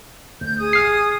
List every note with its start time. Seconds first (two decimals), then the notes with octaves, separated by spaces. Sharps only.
0.41 D2 G6
0.60 G#4 D#6
0.73 A1 F6 C7